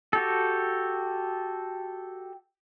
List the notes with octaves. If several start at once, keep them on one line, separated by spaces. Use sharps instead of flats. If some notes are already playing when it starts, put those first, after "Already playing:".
F#4 G4 A4